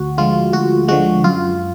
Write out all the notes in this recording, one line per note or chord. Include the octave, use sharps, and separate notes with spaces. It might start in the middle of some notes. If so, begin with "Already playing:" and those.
Already playing: D2 F#4
D3 F3 G#3 F4
D2 F#4
D3 F3 G#3 F#4
F#2 F4